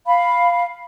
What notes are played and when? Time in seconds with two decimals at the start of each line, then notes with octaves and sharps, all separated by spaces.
0.06 F5 B5